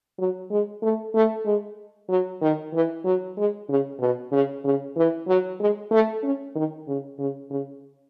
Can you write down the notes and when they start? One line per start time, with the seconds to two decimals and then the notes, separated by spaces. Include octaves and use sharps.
0.18 F#3
0.51 G#3
0.82 A3
1.14 A3
1.45 G#3
2.09 F#3
2.42 D#3
2.73 E3
3.04 F#3
3.37 G#3
3.69 C#3
4.00 B2
4.32 C#3
4.65 C#3
4.96 E3
5.27 F#3
5.60 G#3
5.91 A3
6.23 C#4
6.55 D#3
6.87 C#3
7.19 C#3
7.50 C#3